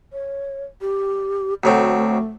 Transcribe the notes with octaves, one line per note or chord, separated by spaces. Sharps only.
C#5
G4
D2 F#3 C4 A4
A3